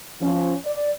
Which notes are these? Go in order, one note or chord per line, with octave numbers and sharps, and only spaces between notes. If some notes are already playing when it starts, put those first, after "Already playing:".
F3 C#4
D5